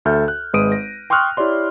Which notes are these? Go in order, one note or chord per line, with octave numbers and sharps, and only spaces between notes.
D2 A4 E5 F6 G6
F#6
G#1 G#3 B4 D#6 D7 D#7
A#6
G5 C6 C#6 D#6 F6 F#6
E4 G4 C#5 D5 C6